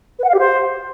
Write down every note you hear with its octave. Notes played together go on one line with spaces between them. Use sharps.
B4
F#5
F5
G4
C5